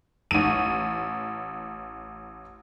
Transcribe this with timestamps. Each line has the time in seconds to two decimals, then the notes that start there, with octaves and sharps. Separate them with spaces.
0.31 A1 D#7